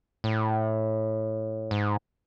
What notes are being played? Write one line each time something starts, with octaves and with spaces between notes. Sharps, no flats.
A2
G#2